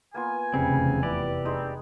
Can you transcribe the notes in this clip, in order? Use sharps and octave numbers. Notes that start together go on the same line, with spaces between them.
A#3 B3 F4 G#5
F1 E2 C#3 G3 C4
E4 G4 B4 D5
G3 G#3 C4 D#4